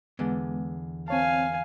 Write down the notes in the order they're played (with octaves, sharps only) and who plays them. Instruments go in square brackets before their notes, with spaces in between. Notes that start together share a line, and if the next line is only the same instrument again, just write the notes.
[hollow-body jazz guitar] E2 D3 [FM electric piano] G#3 B3
[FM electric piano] C4 C#5 A5 [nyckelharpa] F5 G#5